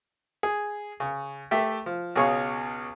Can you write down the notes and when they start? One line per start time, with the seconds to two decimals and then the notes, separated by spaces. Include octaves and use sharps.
0.43 G#4
1.00 C#3 C#6
1.51 A3 G4 E5 G5
1.86 F3
2.15 C#2 B2 G#4 C#5 F5 C#6